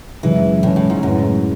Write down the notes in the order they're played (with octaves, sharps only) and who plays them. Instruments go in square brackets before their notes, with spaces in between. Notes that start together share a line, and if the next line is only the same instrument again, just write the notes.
[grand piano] F#2 C#3 G#3 C#4 [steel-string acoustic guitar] E3
[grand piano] F#2 C#3 G#3 C#4 [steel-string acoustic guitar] A2
[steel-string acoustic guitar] A2
G#2
[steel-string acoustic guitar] F#2 [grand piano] A2 G#3 C#4 E4 B4